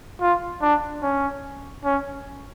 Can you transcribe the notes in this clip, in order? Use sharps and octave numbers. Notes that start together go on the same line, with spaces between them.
F4
D4
C#4
C#4